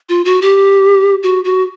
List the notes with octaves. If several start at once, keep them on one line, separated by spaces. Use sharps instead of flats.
F4
F#4
G4
F#4
F#4